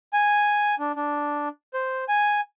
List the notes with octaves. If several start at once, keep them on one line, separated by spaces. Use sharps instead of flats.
G#5
D4
D4
C5
G#5